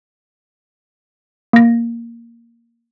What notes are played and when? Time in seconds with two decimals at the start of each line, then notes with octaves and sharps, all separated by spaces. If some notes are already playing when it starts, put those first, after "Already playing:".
1.53 A#3 A#6